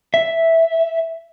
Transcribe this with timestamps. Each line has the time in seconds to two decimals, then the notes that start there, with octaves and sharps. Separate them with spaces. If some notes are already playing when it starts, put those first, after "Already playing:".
0.14 E5